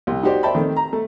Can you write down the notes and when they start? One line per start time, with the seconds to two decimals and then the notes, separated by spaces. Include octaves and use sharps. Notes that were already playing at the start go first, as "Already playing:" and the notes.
0.07 C2
0.23 D#4 F#4 G4 C5 D5
0.43 C5 D5 E5 G5 A5 B5
0.55 D#3 A3 C4
0.76 A#5
0.93 A3